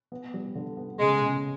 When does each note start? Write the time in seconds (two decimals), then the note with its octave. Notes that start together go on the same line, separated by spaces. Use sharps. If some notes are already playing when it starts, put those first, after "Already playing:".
0.12 B3
0.34 G3
0.55 D3
0.77 B3
0.99 C#3 G#3
1.21 C#3